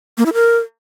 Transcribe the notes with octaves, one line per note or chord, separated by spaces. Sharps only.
A#3
E4
A#4